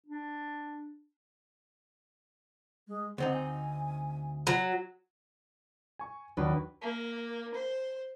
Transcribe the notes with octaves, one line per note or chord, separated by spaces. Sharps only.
D4
G#3
D2 C4 D#4 F#5
G#5
F#3
G#5 C#6
D#2 F#3 D4 F#4 B4
A#3
C5